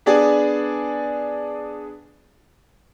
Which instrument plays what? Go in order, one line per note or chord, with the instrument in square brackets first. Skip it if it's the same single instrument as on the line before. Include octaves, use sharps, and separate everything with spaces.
[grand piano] B3 D4 G#4 D5 G#5